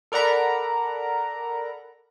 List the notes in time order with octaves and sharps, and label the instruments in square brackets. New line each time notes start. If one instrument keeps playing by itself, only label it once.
[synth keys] A4 A#4 D5 F#5 A#5 B5